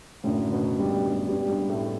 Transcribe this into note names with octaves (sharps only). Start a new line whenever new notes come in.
F#1 F#2 A2 D3 A3
B2 B3
G2 G3
G2 G3
G2 G3
G2 G3
A2 A3